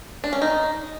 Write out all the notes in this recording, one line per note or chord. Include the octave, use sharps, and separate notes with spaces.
D4
C#4
D#4